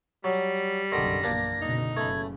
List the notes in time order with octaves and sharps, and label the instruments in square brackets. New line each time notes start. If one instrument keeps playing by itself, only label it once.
[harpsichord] F#3 [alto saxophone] G3
[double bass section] F#1 B1 F#2 [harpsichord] D3 D#3 [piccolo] A#6
[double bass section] A#1 E2 [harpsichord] A#3 D4
[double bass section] C#2 B2 D3 [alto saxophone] D#4
[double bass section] F#1 C#3 [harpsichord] A3 B5 [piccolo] G#6